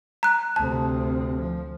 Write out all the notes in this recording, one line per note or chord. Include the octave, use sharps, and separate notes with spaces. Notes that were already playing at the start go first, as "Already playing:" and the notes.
A#5 F#6
D2 C3 A5
F3